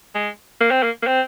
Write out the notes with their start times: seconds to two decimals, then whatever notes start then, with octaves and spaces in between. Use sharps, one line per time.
0.15 G#3
0.61 A#3
0.71 C4
0.83 A#3
1.02 A#3
1.07 C4